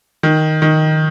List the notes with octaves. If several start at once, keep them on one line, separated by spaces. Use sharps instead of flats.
D#3
D#3